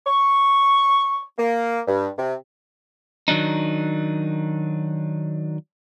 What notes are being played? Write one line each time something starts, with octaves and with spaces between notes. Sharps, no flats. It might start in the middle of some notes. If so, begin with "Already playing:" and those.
C#6
A#3
G2
C3
D#3 F#3 D4 D#4